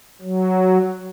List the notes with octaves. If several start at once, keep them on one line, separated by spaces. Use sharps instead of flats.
F#3